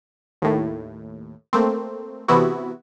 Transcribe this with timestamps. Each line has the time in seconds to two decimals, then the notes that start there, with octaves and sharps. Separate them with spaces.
0.42 D#2 A2
1.53 A3 A#3 C4
2.28 C3 E3 B3 E4 F#4